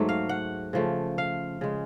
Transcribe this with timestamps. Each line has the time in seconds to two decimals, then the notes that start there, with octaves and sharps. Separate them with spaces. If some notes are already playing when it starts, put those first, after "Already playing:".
Already playing: G#2 F#3 A3
0.09 F5
0.29 F#5
0.73 C#3 F3 A3
1.18 F5
1.61 C#3 G#3